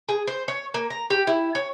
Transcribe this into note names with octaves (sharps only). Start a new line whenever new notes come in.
G#4
C5
C#5
A#3
A#5
G4
E4
C#5